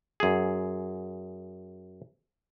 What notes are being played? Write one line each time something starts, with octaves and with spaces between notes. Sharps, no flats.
F#2 G#4